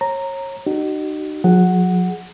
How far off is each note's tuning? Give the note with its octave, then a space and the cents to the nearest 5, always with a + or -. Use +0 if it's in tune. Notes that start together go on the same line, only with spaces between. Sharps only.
C#5 -30 A#5 -10
D#4 -30 F#4 +40
F#3 -45 G#4 +0 F#5 +0